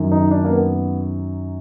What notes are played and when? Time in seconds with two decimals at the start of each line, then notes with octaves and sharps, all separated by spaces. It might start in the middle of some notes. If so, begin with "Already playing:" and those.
Already playing: F#2 D#3
0.12 D#4
0.31 D4
0.44 A#3
0.52 B3